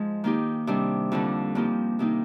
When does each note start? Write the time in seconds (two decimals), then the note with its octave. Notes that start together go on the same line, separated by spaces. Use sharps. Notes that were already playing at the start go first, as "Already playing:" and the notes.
Already playing: G#2 F3 G#3
0.24 D#3 A#3 D#4 G4
0.67 C3 D#3 G3 D4
1.12 F2 D3 G3
1.55 G2 F3 A#3 D#4 G4
1.99 C3 D#3 A#3 D#4